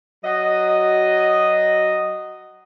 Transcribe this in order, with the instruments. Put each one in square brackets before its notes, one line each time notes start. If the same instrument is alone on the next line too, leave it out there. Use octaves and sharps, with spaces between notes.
[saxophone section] F#3 D#5